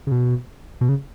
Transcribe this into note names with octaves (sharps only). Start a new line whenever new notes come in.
C#3
B2
B2
C#3